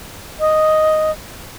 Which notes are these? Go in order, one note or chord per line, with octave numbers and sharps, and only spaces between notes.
D#5